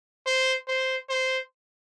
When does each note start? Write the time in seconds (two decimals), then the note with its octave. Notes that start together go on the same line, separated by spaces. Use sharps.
0.26 C5
0.68 C5
1.10 C5